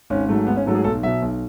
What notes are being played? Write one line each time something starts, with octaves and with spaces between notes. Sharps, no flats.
G#1 C#4
G#2 F#3 A3
G#1 B3
C#4
G#2 F#3 A3 A4
G#4
B1 A4
B2 F#3 E5
B1